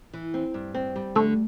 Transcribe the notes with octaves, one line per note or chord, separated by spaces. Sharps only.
E3
C4
G2
C4
G3
D3 A3